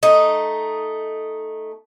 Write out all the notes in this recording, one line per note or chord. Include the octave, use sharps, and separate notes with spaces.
A3 D#4